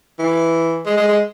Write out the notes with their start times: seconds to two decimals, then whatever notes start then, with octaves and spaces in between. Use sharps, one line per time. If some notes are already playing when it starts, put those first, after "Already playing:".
0.19 E3
0.86 G#3
0.96 G#3
1.08 G#3